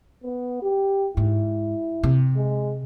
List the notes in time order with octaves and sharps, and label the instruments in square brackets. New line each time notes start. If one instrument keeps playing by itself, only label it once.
[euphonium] B3
G4
[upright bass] G#2 [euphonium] E4
[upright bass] C3
[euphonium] G#3